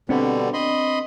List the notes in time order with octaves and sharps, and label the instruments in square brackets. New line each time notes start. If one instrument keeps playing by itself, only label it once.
[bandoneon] B2 D3 G3 [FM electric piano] C4 D4
[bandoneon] D#5 B5 C6